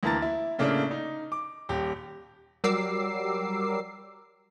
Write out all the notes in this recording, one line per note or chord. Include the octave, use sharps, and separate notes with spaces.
D2 E3 A#3 A5 A#5 A6
E4
A2 C#3 A3 A#3 D4
D#4
D6
D#1 G4
F#3 G3 A#4 D6 E6 C7